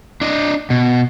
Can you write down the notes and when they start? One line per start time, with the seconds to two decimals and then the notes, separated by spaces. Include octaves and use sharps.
0.21 D4 D#5
0.70 B2